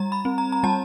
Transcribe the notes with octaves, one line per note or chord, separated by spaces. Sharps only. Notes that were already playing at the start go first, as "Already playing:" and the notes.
Already playing: G3 A#5
B5
C4
A#5
A#5
G3 A5